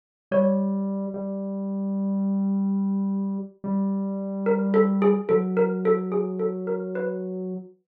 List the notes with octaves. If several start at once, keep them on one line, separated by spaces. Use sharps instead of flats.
G3 C#5
G3
G3
A#4
A4
G#4
F#3 A4
A#4
A4
G#4
A4
A#4
B4